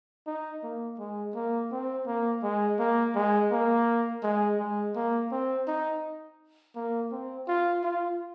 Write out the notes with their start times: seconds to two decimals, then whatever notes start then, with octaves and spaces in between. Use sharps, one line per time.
0.27 D#4
0.63 A#3
0.99 G#3
1.35 A#3
1.71 C4
2.07 A#3
2.43 G#3
2.79 A#3
3.15 G#3
3.52 A#3
4.23 G#3
4.60 G#3
4.96 A#3
5.32 C4
5.68 D#4
6.76 A#3
7.12 C4
7.48 F4
7.84 F4